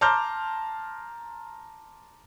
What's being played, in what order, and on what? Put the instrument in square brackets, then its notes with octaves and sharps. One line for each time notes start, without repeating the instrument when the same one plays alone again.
[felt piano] A5 A#5 C6 D6 F6 G6